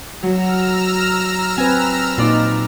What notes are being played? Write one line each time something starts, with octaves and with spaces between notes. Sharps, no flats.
F#3 A#5 E6 F6
C4 B4 G#5
A#2 D#4 F4 B4 D5